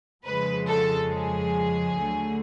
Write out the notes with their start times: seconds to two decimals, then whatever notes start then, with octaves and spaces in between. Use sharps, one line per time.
0.23 F2 C#3 F3 G#3 B4
0.67 A4
1.11 G#4
1.98 D2 D3 F#3 A3